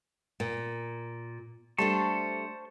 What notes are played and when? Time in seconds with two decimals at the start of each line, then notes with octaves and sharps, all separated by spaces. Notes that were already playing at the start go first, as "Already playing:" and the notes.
0.40 A#2
1.78 G3 A3 D4 C5 A5 C#6